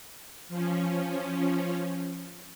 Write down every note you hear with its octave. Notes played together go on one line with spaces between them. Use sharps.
F3 C#4